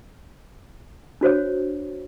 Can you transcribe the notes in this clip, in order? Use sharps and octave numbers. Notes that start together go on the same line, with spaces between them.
D4 F#4 C5 C#5